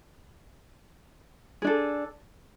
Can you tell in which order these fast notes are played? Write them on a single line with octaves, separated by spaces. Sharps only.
G#4 D4 A4